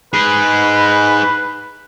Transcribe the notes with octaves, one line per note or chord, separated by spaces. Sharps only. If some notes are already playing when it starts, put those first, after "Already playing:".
D#4 G#4 B4